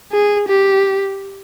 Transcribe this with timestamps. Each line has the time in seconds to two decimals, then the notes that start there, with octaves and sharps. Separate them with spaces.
0.12 G#4
0.48 G4